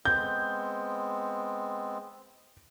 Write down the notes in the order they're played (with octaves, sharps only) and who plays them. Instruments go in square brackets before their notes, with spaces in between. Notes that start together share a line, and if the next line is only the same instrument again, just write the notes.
[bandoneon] G#3 B3 C4 [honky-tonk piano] G6